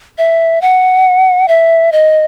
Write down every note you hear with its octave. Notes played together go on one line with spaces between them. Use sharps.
E5
F#5
E5
D#5